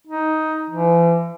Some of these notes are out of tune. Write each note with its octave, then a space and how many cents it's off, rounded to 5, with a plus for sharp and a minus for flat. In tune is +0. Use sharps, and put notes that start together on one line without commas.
D#4 +10
E3 +40